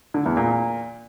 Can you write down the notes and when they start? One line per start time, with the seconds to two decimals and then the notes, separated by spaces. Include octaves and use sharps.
0.14 D3
0.26 E2
0.37 A#2